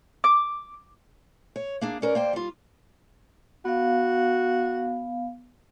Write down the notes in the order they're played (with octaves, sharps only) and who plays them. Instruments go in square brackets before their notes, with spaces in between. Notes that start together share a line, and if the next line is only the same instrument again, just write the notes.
[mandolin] D6
[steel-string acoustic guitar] C#5
A#3 D4 G#4
[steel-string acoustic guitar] C#4 A#4 B4 [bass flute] D5
[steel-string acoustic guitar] A#3 C5 G5
G3 F4
[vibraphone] B3 F5 [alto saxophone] F#4